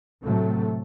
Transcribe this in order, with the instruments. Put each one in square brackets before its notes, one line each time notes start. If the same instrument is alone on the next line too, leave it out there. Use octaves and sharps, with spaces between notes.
[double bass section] A2 C3 F#3 A3